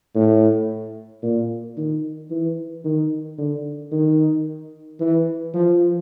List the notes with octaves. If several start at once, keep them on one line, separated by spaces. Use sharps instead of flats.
A2
A#2
D#3
E3
D#3
D3
D#3
E3
F3